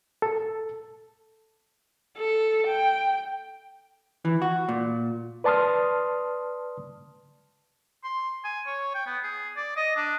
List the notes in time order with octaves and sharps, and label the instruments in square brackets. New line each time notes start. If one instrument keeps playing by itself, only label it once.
[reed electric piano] A4
[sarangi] A4
G5
[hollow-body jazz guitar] E3
F#4
A#2
[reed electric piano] B4 D5 A5 C6 D#6 F6
[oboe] C6
G#5
C#5
G5
B3
G#4
D5
D#5
D4